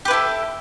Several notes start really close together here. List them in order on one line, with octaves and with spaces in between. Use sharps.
G4 B4 E4 A4